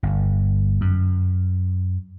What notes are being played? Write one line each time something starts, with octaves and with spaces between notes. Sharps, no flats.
G1
F#2